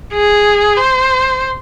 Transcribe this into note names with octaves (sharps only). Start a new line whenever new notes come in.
G#4
C5